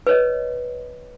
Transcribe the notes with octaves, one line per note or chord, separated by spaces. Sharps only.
B4 C#5 D#5